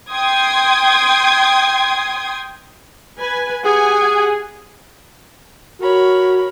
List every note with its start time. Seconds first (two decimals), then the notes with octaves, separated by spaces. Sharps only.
0.12 G5 C6 D#6 G#6
3.19 B4 G#5
3.65 G4 G#4 F#5 G#5
5.82 F#4 A#4 C#5 B5